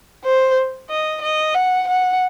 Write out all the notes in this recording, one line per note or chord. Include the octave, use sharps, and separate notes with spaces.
C5
D#5
D#5
F#5
F#5